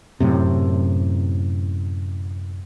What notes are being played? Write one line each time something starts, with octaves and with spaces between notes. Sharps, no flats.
F#2 A2 C3